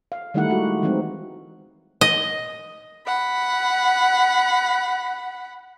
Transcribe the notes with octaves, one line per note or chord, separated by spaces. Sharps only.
F5
D#3 G3 A3 D#4 E4 F#5
G#3 F#4
E3 F#3 G#3 C4 D#4
D#5
F#5 B5